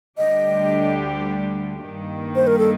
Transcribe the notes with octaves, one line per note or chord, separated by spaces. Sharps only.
D2 D3 G3 D4 G4 D#5
G2 D#3 A#3
C5
A#4
A4